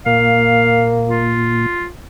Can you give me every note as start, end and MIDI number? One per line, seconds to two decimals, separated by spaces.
0.06 1.66 46
0.06 1.33 58
0.06 0.95 77
1.08 1.87 65